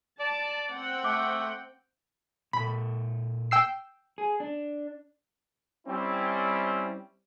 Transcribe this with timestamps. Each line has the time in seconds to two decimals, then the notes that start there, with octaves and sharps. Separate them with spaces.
0.19 D5 A5
0.72 C4 F#5 G5
1.04 A3 D6
2.53 A#2 A4 B5
3.51 G5 E6 C7
4.18 G#4
4.40 D4
5.87 G3 C4 C#4 E4